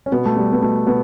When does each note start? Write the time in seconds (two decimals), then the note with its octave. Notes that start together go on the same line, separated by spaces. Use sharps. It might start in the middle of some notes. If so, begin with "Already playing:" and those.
0.06 C#4
0.12 B2 B3
0.26 A3
0.36 B2 G3
0.52 B3
0.62 B2 A3
0.87 B2 B3